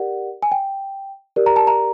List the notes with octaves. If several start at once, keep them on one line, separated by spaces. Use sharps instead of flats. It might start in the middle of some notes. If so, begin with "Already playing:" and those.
Already playing: G4 A#4 D5 F#5
G#5
G5
G4 A#4 D5
A#5
A5
A#5